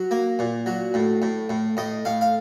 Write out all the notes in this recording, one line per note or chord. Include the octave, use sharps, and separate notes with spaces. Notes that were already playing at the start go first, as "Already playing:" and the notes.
Already playing: F#3
A#3
A#2
F#3
A2
A2
A2
A2 D#5
A2 F5
F5